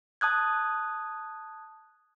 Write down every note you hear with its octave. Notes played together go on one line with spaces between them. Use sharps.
A5 D#6 F#6 G#6